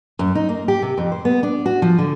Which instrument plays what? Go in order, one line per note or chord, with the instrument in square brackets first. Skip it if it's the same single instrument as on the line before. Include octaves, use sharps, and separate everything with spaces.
[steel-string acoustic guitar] F#2
D#4
A#3
G4
C3
F2
C5
B3
D4
F#4
F3
D3